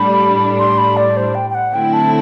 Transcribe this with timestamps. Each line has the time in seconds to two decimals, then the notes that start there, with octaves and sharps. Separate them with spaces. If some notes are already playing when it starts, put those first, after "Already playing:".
Already playing: A2 G3 D4 B5
0.59 C6
0.78 B5
0.97 D5
1.17 C5
1.35 G5
1.50 G5
1.55 F#5
1.73 D3 F#3 A3 C4 E4 G5
1.93 A5